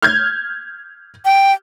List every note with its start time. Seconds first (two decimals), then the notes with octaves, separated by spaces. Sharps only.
0.02 F6 G6 G#6
1.25 G5